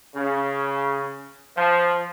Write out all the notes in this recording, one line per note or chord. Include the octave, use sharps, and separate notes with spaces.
C#3
F3